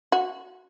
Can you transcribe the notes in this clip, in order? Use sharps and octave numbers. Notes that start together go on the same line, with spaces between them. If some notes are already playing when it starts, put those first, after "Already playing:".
F#4